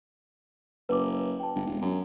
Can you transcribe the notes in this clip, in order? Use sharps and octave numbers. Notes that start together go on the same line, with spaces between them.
F#1 B4 D6
G5 A5
G1
E1
F#2